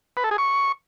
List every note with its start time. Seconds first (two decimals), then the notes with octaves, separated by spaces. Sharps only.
0.17 B4
0.24 A4
0.31 G#4
0.38 C#6